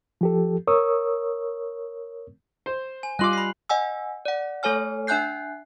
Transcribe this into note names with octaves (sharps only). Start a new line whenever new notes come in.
F3 G4 A4
A#4 C#5 C#6 D#6 E6
C5
G#5
G3 F4 D#5 C6 D6 F#6 F#7
B5 C7
D#5 F#5 G#5 E6
D5 F#5
A3 A4 C#5 G#5 F6
D4 E5 G#5 F#6 G6 C7